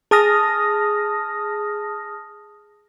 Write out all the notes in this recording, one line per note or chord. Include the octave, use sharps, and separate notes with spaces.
G#4 A5 D#6 F6 A#6